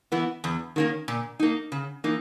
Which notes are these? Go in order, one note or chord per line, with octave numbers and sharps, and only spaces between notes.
E3 B3 E4
E2
D#3 A#3 C#4
A#2
A#3 D#4
C#3
E3 A#3 D#4